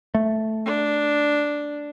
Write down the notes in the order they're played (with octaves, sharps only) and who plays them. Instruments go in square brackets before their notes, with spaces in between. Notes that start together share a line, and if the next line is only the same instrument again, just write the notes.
[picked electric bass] A3
[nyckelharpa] D4